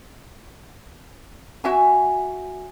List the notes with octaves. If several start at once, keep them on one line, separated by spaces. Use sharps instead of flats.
F#4 E5 G#5